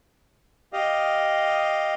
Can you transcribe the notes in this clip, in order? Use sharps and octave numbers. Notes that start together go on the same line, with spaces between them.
G4 D#5 F5